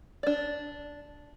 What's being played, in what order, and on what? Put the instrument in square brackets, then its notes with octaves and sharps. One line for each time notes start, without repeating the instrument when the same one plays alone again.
[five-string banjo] D4 D5